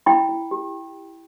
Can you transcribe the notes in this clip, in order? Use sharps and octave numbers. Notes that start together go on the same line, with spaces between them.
E4 G5 B5
E4
G4